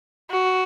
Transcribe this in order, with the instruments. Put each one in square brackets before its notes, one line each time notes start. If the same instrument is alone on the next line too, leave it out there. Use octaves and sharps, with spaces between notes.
[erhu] F#4